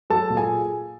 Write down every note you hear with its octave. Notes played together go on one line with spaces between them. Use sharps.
F#3 A4 A5
A#2
G#4 G#5